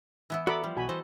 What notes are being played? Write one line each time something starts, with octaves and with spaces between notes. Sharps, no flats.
E3 B3 E4
B3 F#4 A4 D5 A#5 B5 D6
F3 G3
B1 B2 F#4 G#5 B5
E3 A4 C5 D#5